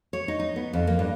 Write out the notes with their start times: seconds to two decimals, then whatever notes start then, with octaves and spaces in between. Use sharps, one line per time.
0.13 C#5
0.28 D#4
0.39 D#4
0.56 B3
0.73 F2
0.87 A#3
0.99 G2